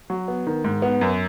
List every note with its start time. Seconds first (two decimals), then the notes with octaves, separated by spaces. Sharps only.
0.10 F#3
0.28 B3
0.47 D#3
0.64 G#2
0.82 B3
1.01 F#2